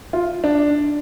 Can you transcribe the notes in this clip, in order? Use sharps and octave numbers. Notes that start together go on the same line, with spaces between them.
F4
D4